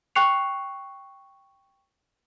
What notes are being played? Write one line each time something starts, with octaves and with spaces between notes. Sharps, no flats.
G5 C#6 F#6 C7 C#7 F7